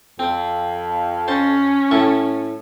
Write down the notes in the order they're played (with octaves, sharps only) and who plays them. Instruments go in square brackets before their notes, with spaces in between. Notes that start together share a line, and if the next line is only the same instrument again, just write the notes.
[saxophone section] F2 [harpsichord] C4
[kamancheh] C#4 [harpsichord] C5 A5
[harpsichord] A2 A4 C#6